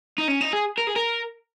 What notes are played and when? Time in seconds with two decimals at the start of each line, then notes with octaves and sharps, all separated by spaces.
0.18 D#4
0.28 C#4
0.41 D#4
0.53 G#4
0.78 A#4
0.87 G#4
0.96 A#4